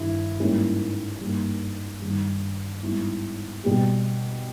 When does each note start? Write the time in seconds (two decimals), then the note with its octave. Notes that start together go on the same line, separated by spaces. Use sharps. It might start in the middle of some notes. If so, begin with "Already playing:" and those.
Already playing: G2 D#3 E4
0.40 G#2 G3 A#3 C#4 E4
1.20 G2 G3 A#3 D#4
2.02 G2 D#3 G3
2.83 G#2 G3 B3 E4
3.64 B2 G3 B3 G4